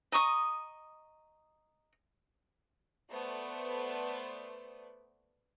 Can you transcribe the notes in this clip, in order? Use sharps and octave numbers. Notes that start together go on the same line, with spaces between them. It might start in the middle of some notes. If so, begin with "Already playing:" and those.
D#5 A#5 C#6 D#6
A3 B3 B4 C5 D5